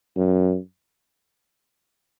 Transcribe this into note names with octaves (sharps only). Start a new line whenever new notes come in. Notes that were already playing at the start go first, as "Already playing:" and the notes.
F#2